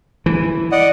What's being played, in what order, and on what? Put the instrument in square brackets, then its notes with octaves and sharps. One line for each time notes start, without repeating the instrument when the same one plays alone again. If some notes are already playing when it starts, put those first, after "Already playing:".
[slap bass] E3
[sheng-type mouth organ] D5 D#5 F#5